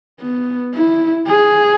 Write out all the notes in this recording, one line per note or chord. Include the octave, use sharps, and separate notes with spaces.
B3
E4
G#4